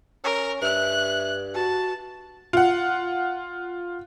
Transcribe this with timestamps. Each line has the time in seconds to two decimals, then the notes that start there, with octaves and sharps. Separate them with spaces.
0.24 C#4 A#4
0.62 G2 E5 F#6
1.55 F#4 A5
2.53 F4 F#5